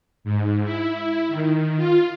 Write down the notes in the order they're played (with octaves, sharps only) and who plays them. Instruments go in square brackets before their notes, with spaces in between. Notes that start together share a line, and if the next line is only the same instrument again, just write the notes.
[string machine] G#2
E4
D#3
F4